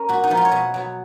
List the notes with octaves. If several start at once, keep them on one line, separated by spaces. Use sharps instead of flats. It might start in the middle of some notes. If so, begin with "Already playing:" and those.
Already playing: C#4 A#4
A#2 F#4
D#4
F3 B3
F4
C#5
B2 D#5
F#3 B3